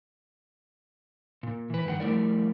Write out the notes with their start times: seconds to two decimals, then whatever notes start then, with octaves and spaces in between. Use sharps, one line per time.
1.43 A#2
1.70 E3 B4
1.85 G2 D#3 G#4 F#5
2.00 F3 G3 A3 E4 A#4 D5